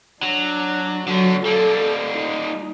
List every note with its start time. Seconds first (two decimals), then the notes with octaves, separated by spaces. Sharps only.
0.23 F#3 D4
1.07 D3 F#3 B3
1.45 G3 A#3 A4
2.13 D#4